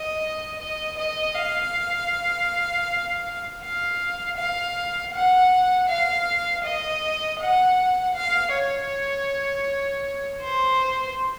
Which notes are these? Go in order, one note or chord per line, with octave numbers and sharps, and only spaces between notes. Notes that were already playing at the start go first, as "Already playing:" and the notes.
Already playing: D#5
D#5
D#5
F5
F5
F5
F#5
F5
D#5
F#5
F5
C#5
C5